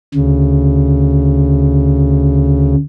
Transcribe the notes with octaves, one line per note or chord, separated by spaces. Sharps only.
D2 C#3